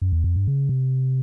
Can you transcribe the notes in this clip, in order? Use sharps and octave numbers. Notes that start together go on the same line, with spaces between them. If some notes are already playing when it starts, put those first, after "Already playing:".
F#2
E2
F2
G2
C#3
C3